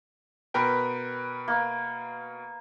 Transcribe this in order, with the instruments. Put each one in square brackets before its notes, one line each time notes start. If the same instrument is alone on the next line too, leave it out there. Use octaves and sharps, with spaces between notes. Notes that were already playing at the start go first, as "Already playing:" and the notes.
[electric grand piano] B2 A#4 G5 [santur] B4
[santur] A#3